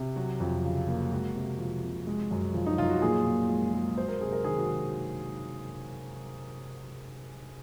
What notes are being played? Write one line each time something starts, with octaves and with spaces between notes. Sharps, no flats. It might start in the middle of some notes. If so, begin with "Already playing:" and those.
Already playing: C3
F#3 F#4
F2
C#3
A#3
G#3 F#4
C3
F3
C3
G#3
F#2
F3
D#4
F#2 F4
F#4
A#2 G#4
A#2
G#3
G#3
F#3 C5
A#4
C3 G#4
A#4
D#3 G#4
F#4